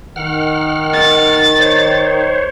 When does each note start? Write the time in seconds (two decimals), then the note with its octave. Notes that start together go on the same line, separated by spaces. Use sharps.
0.16 D#3 F#5 F6
0.93 A6
1.60 C5 C#5